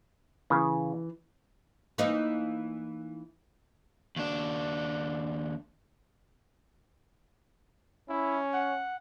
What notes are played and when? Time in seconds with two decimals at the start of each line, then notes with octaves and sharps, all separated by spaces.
0.50 C#3 E3
1.98 E3 A#3 D#4
4.16 D#2 D4
8.09 C#4 E4
8.54 F#5